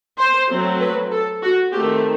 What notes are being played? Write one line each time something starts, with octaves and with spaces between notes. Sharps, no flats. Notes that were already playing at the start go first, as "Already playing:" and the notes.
C5
F#3 A3 C4
B4
A4
F#4
D#3 A3 C4 G4